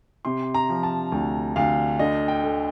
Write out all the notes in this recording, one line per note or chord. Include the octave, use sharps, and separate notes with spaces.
C3 C6
A#5
F3
A5
D2
D2 F5
D3 D#5
G5
A3